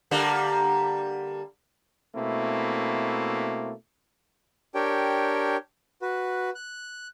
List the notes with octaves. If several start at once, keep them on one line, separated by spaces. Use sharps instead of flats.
D3 G3 A#3
B2 A3 A#3 C4 E4
D4 G4 A#4 C#5 G5
F#4 B4
F#6